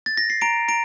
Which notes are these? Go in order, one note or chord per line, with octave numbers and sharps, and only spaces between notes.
A6
A#6
C7
A#5 D7
A#5 D7